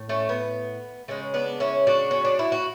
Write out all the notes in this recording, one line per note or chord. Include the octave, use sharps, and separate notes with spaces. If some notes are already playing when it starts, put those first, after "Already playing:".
Already playing: A2
A3 C#4
B3
C#3 G#3 A3 C#4
B3 D4
C#4 E4
D4 F#4
C#4
D4
E4
F#4